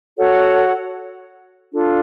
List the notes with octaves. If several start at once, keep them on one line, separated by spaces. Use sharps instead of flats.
F#4 A4 C#5 F#5
D4 F4 A4